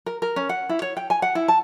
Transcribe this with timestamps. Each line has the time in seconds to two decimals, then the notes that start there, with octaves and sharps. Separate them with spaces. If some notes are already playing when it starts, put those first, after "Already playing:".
0.06 A#4
0.22 A#4
0.36 C#4
0.49 F#5
0.69 E4
0.82 C#5
0.97 G5
1.10 G#5
1.22 F#5
1.35 E4
1.48 A5